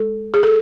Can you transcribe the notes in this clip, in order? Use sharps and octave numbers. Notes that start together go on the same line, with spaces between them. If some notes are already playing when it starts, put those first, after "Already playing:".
Already playing: G#3 A4
G#4
A4